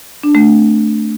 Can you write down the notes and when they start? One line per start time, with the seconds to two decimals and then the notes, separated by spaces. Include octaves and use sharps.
0.23 D4
0.35 A3
0.46 C4